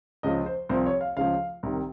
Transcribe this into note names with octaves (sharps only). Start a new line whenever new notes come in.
C#2 C#3 F3 D#5
C5
C2 C3 F3 C5
C#5
F5
C#2 C#3 F3 F5
C2 C3 D#3